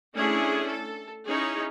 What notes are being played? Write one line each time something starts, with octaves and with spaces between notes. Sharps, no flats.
A3 C#4 D4 E4 G#4
A4
C#4 D#4 E4 G#4 C#5